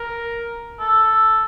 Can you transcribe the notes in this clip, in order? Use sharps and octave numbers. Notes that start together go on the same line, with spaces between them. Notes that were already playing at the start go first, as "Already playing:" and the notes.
Already playing: A#4
A4